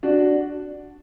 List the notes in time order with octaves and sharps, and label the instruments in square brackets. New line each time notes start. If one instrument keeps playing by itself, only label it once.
[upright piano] D4 F#4